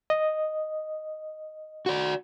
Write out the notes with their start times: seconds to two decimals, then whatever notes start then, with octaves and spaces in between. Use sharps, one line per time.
0.10 D#5
1.86 F#4 D5